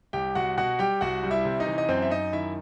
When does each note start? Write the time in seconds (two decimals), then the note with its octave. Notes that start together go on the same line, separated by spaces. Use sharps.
0.13 C2 G4 G5
0.35 C2 F#4 F#5
0.57 B2 F#4 F#5
0.79 G3 G4 G5
1.01 C2 F#4 F#5
1.23 G3
1.31 E4 E5
1.45 C3
1.60 D#4 D#5
1.67 E3
1.78 D#5
1.89 F#2 C4 C5
2.02 E5
2.11 F#2 D#4 D#5
2.33 D#3 E4 E5